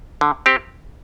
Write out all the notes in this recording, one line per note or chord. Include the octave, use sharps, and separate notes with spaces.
D3
C4 G4